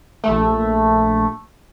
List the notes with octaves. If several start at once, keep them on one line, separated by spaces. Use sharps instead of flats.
A#1 A3